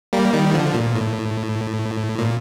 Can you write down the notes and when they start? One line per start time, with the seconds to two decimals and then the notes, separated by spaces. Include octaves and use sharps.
0.13 G3 A#3
0.33 D#3 G3
0.54 D3 F3
0.74 A#2
0.95 A2
2.19 A#2